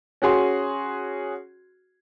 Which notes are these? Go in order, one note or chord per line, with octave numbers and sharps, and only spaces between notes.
C#4 F#4 G#4 C6